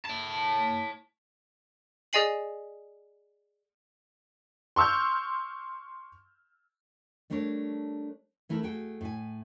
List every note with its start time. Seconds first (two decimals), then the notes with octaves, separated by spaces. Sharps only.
0.05 C#5 A5
2.13 G#4 D5 D#5 G#5 C7 F#7
4.76 C6 C#6 E6 F6 G6
7.30 G3 A3 D4 A#4 C#5
8.49 E3 A3 E4 A#4
8.63 A3 F#4 G#4 G5
9.01 A2 E5 G#5